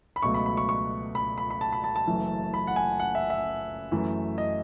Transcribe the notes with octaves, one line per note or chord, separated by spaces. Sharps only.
B5
C#2 B2 F#3 A3 C#6
B5
B5
C#6
C#6
B5
B5
B5
A5
B5
A5
A5
F#1 F#2 E3 A3
B5
F#5
G#5
F#5
E5
E5
F#2 E3 A3
D#5